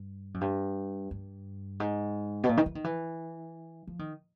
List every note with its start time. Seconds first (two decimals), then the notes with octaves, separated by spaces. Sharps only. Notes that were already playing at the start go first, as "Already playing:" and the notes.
Already playing: G2
0.34 F#2
0.41 G2
1.11 G2
1.80 G#2
2.44 B2
2.49 A#2
2.57 D#3
2.66 E3
2.75 D#3
2.84 E3
3.87 F3
3.99 D#3